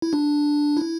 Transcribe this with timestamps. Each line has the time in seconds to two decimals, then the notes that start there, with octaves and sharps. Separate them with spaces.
0.02 E4
0.13 D4
0.77 E4